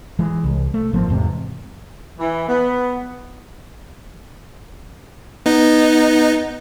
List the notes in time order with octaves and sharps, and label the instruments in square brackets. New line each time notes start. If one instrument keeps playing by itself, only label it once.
[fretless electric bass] E3 G#3
C2
A3
G#1 F3 A#3 C4
E2 G#2 C3
[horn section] E3
B3
[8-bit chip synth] B3 D#4